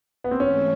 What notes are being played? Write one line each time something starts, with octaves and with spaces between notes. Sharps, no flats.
B3
C4
G#2 E3 A3 C#4